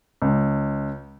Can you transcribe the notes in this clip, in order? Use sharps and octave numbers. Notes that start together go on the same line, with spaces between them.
C#2